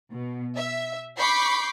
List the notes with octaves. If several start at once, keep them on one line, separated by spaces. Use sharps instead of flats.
B2
E5
B5 C#6 D6 G6 B6 C7